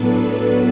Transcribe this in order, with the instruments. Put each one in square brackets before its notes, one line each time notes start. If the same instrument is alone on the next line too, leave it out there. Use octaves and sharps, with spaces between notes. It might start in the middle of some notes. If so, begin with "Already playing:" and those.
Already playing: [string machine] A2 F#3 B3 D4 A4 B4